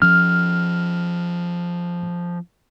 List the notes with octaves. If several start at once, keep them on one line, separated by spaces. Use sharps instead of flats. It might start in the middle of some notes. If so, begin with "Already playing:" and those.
F3 C#4 F6